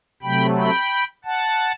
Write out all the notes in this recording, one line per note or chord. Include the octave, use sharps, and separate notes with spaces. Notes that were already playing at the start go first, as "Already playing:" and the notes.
C3 F#3 A3 G5 B5
G5 B5
F#5 A5